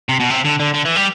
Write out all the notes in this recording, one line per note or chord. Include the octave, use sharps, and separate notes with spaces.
C3
B2
C3
D3
D3
D3
E3
G3